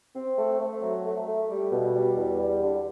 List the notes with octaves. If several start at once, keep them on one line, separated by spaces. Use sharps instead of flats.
C4
A3
A3
F#3
A3
A3
G3
B2
G3
E2
G3
D3